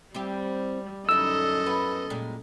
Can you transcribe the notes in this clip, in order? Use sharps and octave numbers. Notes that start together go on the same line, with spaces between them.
G3 C4 E4 G4
F#2 D3 D#4 E4 A4 D#5 E6
B3 B4
A#2 G3 G#3